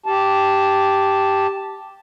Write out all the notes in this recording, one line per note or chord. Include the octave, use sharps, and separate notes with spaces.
G4 A5